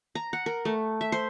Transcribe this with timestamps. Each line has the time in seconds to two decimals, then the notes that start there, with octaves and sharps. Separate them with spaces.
0.15 A#5
0.33 F#5
0.46 A#4
0.65 A3
1.01 E5
1.12 C5